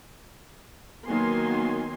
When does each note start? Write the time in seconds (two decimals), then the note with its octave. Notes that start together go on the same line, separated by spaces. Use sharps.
1.06 D#3 F#3 A#3 B3 G#5 C6